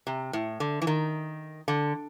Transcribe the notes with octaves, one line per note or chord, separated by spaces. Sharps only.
C3
A2
D3
E3
D#3
D3